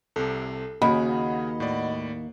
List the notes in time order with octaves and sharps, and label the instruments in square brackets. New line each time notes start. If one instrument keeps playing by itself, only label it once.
[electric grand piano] C2 C3 [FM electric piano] A4
[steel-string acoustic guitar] D#2 [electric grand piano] C#3 G#4 [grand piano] F#4 B5 [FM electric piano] D#5 F#5
[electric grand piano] A2 D5